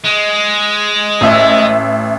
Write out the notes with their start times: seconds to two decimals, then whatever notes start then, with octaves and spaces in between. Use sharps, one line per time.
0.05 G#3
1.21 A1 E5